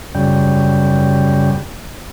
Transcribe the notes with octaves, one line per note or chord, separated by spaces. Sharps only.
F#2 C#3 G3